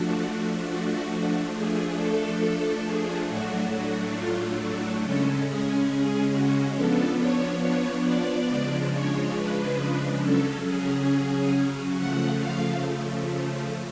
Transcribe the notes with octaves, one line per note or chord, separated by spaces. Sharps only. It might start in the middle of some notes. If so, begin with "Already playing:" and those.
Already playing: F3 A3 D4 F#4
F#4
F3 A3 D4 G#4
A4
A4
G#4
A2 F#3 A3 D4 F#4
F#4
F4
F#4
C#3 G#3 C#4 A4
G#4
G#4
F#4
F3 B3 D4 A4
C#5
C#5
D5
C#3 F3 G#3 D4
C#5
B4
C#3 F#3 C#4 A4
G#4
C#3 F3 A3 F#5
F5